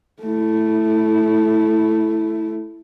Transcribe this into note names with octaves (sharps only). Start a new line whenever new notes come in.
A3 E4